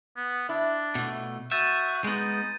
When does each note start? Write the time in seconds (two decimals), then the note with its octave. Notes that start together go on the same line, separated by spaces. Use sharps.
0.17 B3
0.49 D4 E4
0.95 B2 A3
1.51 F#4 E5 G6 A6 D#7
2.04 G#3 B3 D#4